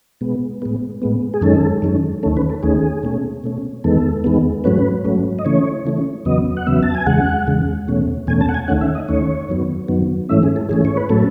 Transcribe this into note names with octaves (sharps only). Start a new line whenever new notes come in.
B2 G#3 B3
A2 G#3 B3
A2 G#3 B3
G#4
F#2 D#3 G#3 C#4 A4
F#2 D#3 G#3 C#4
D#2 D#3 A3 C#4 A4
B4
A4
D#2 D#3 A3 C#4 G#4
B2 A3 C#4
B2 A3 C#4
E2 D#3 G#3 B3 A4
E2 D#3 G#3 B3
G#2 F#3 A3 C#4 B4
G#2 F#3 A3 C#4
D#5
C#3 E3 A3 C#4 C#5
C#3 E3 A3 C#4
E2 C#3 F#3 B3 D#5
F#5
E2 C#3 F#3 B3 E5
A5
G#5
E2 C#3 G#3 F#5
E2 C#3 G#3
E2 B2 A3 C#4
E2 B2 A3 C#4 G#5
A5
F#5
G#5
D#2 D#3 A3 C#4 F#5
E5
D#5
D#2 D#3 A3 C#4 C#5
F#2 D#3 F#3 B3
F#2 D#3 F#3 B3
G#2 E3 A3 C#4 E5
G#4
A4
G#2 E3 A3 C#4 G#4
C#5
B4
A2 F#3 A3 C#4 A4